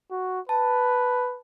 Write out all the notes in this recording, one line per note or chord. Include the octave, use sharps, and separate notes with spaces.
F#4
B4 A5